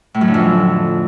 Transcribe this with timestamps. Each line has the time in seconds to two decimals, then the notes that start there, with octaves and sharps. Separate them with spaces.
0.14 A2
0.21 F#2
0.27 D3
0.34 F2